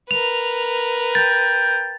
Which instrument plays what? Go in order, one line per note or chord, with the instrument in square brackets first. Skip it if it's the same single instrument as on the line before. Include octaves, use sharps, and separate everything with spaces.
[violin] A#4 B4 [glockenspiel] F7
[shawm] G5 [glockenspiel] A6